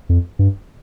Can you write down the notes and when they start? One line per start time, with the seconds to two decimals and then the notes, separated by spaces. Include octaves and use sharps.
0.09 F2
0.39 G2